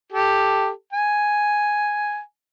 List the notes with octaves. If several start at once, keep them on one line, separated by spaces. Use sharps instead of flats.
G4 A4
G#5